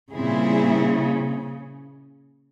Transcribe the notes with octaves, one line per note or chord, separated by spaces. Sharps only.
A#2 C#3 G3 C4 E4 G#4